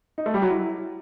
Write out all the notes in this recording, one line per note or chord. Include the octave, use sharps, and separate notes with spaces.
D#4
A3
G3
F#3
E4